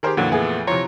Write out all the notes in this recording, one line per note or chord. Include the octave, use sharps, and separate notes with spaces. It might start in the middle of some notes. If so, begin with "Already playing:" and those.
D#3 G4 G#4 A#4 C5
F2 A#2 D3 E3 F#3
A3 B3 G#4
C3 E3 F3 C#5 A#5 C6